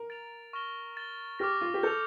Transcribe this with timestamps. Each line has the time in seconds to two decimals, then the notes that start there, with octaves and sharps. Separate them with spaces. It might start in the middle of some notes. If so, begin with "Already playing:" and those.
Already playing: A#4
0.10 A6 D7 F7
0.53 C#6 F6 A#6 E7 G7
0.97 A6 E7 G7
1.39 G4 D6 F6 A#6
1.61 F4
1.74 G4
1.83 A4 G6 C#7 F7